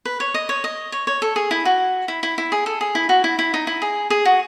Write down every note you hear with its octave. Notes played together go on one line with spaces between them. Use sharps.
B4
C#5
D#5
C#5
D#5
C#5
C#5
A4
G#4
E4
F#4
E4
E4
E4
G#4
A4
G#4
E4
F#4
E4
E4
D#4
E4
G#4
G#4
F#4